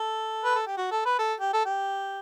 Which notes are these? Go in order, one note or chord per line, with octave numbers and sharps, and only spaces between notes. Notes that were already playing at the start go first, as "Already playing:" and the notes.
Already playing: A4
B4
A4
G4
F#4
A4
B4
A4
G4
A4
G4